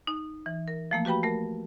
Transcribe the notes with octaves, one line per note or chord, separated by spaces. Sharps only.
D#4
E3
A#4
F3 A3 A#3
F#4 G4 B4 G5 B5
A3 A#4